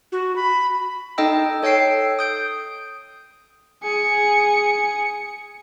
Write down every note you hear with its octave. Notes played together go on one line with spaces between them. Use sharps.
F#4
B5
D#4 A4 D#5 G5 E6
A4 C#5 G5 E6 C7 D7
D#6 G6 D7
G#4 C#7